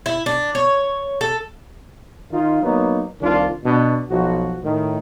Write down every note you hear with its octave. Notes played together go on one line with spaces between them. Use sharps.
E4
D4
C#5
A4
D#3 D#4 F4
F#3 A#3 B3 D#4
C2 D#3 D4 F4
B2 D4
B1 F3 F#4
A2 D#3